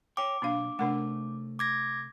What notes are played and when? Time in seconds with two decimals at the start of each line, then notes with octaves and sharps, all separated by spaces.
0.17 C#5 G5 D6
0.42 B1 A#3 D4 F5
0.79 C3 A3 D4 A#4 F#5
1.59 D6 G#6 A#6